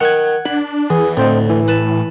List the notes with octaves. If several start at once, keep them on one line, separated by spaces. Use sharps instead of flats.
D#3 F#5 F#6 G#6
D4 B5
E2 E3 G#4
D2 A2 C4 C5 D#5
E3
B4 A5